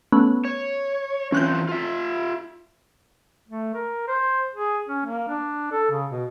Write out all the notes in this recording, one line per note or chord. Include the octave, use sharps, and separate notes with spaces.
A3 B3 C#4
C#5
E3 C4 C#4 F4 F#6 G6
F4 E5
A3
A#4
C5
G#4
C#4
A#3
D4
A4
C#3
B2